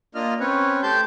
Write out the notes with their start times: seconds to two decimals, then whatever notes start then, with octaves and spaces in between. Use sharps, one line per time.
0.15 A#3 D4 F4 D#5 F6
0.40 C4 C#4 B4 C#5
0.83 A3 G4 A5 C6 G6